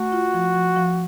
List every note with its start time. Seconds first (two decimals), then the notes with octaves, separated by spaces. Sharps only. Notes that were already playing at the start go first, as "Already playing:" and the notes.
Already playing: A3 F#4
0.12 F4
0.34 F3
0.55 F3
0.77 F3